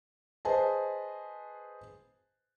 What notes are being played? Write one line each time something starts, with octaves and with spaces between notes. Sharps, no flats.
G#4 B4 C5 D#5 G#5 A5